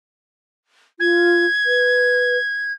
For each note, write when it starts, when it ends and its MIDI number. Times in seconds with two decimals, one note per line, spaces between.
1.00 1.46 65
1.00 2.72 92
1.66 2.37 71